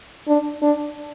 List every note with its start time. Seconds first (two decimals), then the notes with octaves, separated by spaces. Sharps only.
0.28 D4
0.63 D4